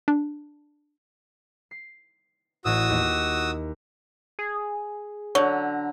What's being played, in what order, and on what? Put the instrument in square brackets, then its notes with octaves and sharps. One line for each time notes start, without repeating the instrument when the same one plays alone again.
[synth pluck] D4
[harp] C7
[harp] A1 A2 [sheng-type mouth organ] F#4 D#6 E6
[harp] D#2
[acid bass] G#4
[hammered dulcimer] D3 A#5 [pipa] F#3 [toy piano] C#5